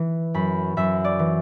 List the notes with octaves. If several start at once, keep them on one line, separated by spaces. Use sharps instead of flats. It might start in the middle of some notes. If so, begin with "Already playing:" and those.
Already playing: E3
F#2 B5
F#2 E5
D5
E3